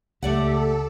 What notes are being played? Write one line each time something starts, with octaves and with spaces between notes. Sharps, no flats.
C#2 A3 G4 A4 D5 F#5